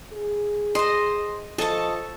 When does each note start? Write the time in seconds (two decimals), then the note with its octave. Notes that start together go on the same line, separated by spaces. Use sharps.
0.13 G#4
0.75 C5 D#5 C6
1.58 F3 A4 D#5 A5 C#6